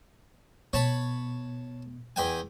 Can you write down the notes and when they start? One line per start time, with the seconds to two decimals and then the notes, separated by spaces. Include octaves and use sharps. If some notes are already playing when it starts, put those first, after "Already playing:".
0.73 B2 C#5 A5 B5
2.16 E2 G5 G#5